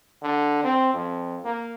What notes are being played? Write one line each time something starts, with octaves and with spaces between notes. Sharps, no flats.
D3
C4
F2
A#3